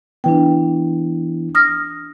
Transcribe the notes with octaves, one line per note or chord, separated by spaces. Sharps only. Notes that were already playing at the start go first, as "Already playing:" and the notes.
E3 B3 D4 G5
D#6 F6 A#6